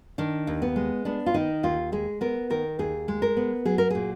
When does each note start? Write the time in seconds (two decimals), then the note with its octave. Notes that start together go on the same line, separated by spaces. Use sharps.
0.18 D#3 D4
0.47 D#2
0.62 B3
0.76 G#3
1.05 B3 D4
1.26 F4
1.34 D#3 D#4
1.63 D#2 F4
1.92 G#3 G#4
2.21 B3 A#4
2.50 D#3 A#4
2.79 D#2 G#4
3.08 G#3
3.22 A#4
3.37 B3
3.65 F#3 G#4
3.78 A#4
3.90 A#2 G#4